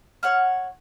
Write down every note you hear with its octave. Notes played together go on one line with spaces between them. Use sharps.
C#5 F#5 F6